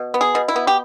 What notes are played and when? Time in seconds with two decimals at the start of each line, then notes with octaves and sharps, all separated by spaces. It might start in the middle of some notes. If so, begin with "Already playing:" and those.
Already playing: B2
0.14 B3
0.21 G#4
0.35 B2
0.48 E4
0.56 B3
0.67 G4